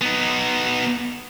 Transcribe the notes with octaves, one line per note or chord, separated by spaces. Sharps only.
B3 D#4